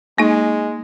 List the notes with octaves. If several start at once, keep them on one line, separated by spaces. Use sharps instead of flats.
G#3 A#3 D#4